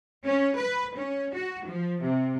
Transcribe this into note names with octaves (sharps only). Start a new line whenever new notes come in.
C#4
B4
C#4
F#4
F3
C3